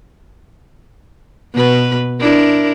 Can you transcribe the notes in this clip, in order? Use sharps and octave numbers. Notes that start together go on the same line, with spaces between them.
B2 B4
D4 E4 A#4